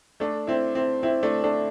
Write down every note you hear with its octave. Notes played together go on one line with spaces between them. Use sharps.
A3 D4
C4 E4
C4 E4
C4 E4
A3 D4
A3 D4